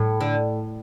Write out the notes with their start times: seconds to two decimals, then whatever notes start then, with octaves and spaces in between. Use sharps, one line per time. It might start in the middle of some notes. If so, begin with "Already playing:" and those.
Already playing: A2
0.21 D3